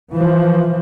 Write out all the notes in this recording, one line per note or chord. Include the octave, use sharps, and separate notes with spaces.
E3 F3